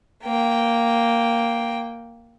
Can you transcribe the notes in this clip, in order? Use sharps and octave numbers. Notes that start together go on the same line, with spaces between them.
A#3 G5